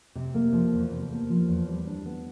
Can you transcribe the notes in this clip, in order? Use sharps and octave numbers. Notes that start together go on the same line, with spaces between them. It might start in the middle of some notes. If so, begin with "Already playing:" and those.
C3
A#3
F3
E2
C3
A#3
F3
E2
G3
D4
B3